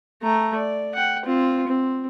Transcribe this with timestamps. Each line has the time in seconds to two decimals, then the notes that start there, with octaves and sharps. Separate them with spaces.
0.23 A3 A#5
0.56 D5
0.95 F#5 G5
1.25 C4 F4
1.68 C4